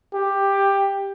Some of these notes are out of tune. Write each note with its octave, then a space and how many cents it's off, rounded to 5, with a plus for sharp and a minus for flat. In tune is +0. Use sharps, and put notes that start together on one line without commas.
G4 +10